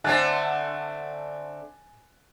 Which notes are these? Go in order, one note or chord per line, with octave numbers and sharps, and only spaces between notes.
D3 A3 C4 G#5 F#6 A6